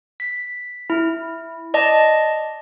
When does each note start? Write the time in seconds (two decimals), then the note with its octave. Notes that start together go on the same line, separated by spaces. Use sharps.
0.20 B6
0.90 E4
1.74 D5 D#5 A5